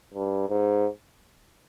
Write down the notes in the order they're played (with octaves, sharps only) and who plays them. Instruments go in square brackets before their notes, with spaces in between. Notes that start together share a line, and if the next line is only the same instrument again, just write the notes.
[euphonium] G2
G#2